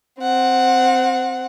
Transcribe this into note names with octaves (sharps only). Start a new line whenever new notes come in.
C4 F#5